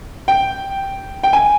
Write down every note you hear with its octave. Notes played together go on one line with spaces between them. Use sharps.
G5
G5
G#5